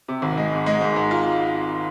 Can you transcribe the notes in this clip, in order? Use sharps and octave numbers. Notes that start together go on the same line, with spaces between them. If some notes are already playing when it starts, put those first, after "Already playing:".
C3
G#1
G#3
G#2
G#3
G#2
G#2
F4